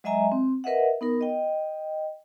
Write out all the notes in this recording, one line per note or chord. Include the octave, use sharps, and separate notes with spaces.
F#3 G#3 D#5 E5 G#5 A#5
C4
A#4 B4 D#5 E5 F#5
B3 D#4 A#4
D#5 G5